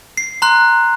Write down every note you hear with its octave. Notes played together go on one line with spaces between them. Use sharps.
C7
A#5 C6 F#6